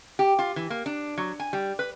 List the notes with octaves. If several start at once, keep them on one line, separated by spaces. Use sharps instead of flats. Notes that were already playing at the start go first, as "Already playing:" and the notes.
G4
F4
E3
A#3
D4
F#3
G#5
G3
B4